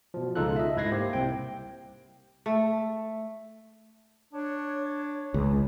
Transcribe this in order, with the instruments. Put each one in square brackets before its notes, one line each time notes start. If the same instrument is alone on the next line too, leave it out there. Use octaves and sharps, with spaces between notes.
[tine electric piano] B2 F3
C#2 C#3 D#4 F4 A4 F#6
D#5 E5
G#2 E4 F#6 G#6 A#6 C7
A#3 G4 C5
C2 C4 G5
[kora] A3
[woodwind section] D4 C#5
[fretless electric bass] C#2